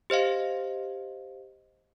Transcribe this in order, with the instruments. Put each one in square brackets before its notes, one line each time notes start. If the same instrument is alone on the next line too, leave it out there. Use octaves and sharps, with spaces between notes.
[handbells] G4 C5 D#5 F5